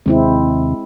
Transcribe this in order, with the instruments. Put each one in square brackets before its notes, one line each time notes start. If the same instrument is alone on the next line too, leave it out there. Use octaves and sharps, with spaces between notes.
[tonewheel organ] D#2 C3 [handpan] G#3 C4 E4